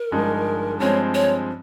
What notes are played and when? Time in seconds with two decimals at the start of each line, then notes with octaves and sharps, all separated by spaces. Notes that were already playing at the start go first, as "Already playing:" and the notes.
Already playing: A#4
0.11 G1 G2 F3 G#3 D#4
0.80 G2 F3 G#3 C4 C#5
1.14 C#5